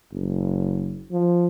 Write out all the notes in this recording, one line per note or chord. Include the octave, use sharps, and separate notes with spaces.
F#1
F3